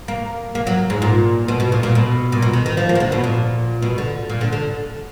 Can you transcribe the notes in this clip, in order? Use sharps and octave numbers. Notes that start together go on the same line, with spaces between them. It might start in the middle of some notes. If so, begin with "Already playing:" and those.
A#3
A#3
F#3
G#2
A#2
B2
B2
A#2
A#2
B2
A#2
B2
D#3
D#3
F3
A#3
D#3
D3
B2
A#2
B2
D3
A#2
D3
D3